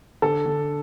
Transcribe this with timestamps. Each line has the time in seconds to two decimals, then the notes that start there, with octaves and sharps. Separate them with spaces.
0.22 D3 A4
0.46 D3